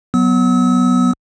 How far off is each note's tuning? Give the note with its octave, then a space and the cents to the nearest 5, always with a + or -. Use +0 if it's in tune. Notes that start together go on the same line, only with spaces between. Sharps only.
F#3 +0 B3 +0 E6 -40